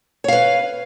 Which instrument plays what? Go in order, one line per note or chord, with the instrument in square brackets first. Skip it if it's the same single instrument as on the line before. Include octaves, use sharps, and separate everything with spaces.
[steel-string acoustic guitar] C#5
F5
B4